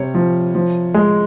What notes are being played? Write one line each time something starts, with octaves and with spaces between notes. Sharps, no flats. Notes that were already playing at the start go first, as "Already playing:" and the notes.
Already playing: C3 G3 C#5
F3
F3
G#3